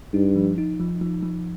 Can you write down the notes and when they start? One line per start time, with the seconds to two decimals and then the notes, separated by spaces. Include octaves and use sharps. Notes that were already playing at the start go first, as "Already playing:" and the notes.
0.14 G2 D#4
0.36 F3
0.58 D#4
0.80 F3
1.01 F3
1.23 F3